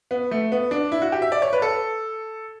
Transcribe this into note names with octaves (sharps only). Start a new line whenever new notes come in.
B3
A3
B3
D4
E4
F#4
G4
E5
D5
C#5
B4
A4